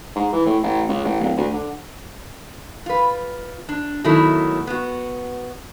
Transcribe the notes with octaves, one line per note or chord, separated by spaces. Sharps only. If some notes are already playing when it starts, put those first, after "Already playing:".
G#2
E3
A2
A1
C#2
A1
D1
D2
D3
F4 B4
D4
B2 D#3 F#3 A3 E4
B3 F#4